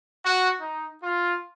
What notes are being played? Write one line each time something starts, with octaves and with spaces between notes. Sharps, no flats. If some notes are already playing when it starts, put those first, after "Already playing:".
F#4
D#4
F4